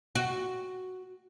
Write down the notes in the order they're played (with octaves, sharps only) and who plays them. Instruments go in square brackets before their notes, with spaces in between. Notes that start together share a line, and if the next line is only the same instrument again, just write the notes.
[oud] F#4